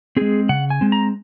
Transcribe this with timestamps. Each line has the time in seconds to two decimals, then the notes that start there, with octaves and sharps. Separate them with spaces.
0.17 G#3 C4 G#4
0.49 C#3 F#5
0.70 G#5
0.81 G#3 C4
0.92 A#5